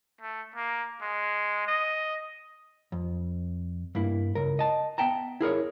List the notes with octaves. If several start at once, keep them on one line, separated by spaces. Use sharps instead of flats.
A3
A#3
G#3
D#5
F2
G2 A#3 E4
C#2 A#4
D#5 A5
B3 E5 G5 A5 A#5
E4 G#4 A#4 C#5